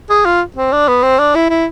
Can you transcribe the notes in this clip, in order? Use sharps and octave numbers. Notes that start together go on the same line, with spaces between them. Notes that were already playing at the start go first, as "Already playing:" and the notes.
G#4
F4
C4
D4
B3
C4
D4
E4
E4